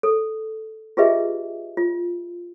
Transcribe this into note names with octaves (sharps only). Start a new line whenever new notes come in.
A4
F4 G4 G#4 B4 D#5 E5
F4